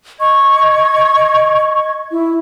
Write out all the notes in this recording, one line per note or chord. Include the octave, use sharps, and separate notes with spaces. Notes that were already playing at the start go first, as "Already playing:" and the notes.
D#5 C#6 G#6
E4